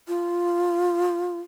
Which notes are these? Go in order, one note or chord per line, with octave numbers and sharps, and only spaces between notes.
F4